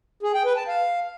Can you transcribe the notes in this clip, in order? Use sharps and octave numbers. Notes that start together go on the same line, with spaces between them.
G#4
G5
B4
A5
F5